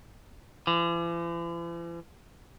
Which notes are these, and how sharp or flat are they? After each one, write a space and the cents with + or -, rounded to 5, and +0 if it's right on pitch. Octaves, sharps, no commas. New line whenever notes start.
E3 +45